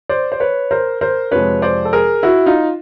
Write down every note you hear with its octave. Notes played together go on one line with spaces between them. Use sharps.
C5 D5
C5
B4 C#5
A#4 C5
A#4 C5
F2 C3 F3 G#3 B4 C#5
C5 D5
A4
G#4 A#4
E4 F#4
D#4 F4